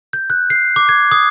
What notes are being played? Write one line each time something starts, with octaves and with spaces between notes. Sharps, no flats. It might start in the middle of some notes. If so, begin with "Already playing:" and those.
G6
F#6
C7
D6
G#6
D#6